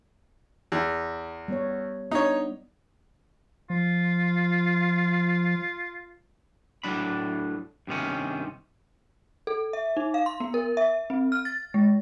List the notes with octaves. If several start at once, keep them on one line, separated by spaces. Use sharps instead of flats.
E2
G3 B3 C#5
B3 D4 D#4 C#5
F3 F4
A2 F#3 D4 B5
G2 C3 D#3 C#4
A4
E5
D#4
F5
C6
B3
A#4
E5
C4
F6
A6
G#3